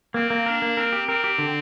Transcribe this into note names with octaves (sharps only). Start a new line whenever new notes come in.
A#3 C4
A#3
D4 A#4
A#3
C4 A#4
G4
C4 A#4
G4
D3